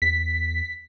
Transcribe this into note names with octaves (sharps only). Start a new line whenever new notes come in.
E2 B6